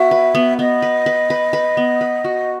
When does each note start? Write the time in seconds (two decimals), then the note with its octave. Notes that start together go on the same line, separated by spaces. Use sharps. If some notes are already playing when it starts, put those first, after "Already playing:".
Already playing: B3 F#4 E5
0.11 B4
0.35 B3
0.59 B3 D#5
0.82 B4
1.06 B4
1.30 B4
1.53 B4
1.77 B3
2.01 B4
2.24 F#4